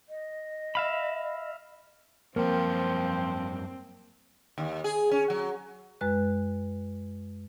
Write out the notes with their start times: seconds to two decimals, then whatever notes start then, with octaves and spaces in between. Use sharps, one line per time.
0.08 D#5
0.75 E5 F5 B5
2.36 F#2 F3 G3 A#3 C4 G5
4.58 D#2
4.84 G#4
5.11 C#4
5.30 F#3
6.01 F#2 G#3 B4 F#6